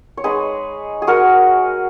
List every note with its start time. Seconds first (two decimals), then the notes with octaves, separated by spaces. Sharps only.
0.17 C#5
0.24 G#3 D#4 G#4 B4
1.02 G#4
1.07 F#4 A#4